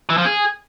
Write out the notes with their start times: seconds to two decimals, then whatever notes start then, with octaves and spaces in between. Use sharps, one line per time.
0.10 E3
0.18 F3
0.25 G#4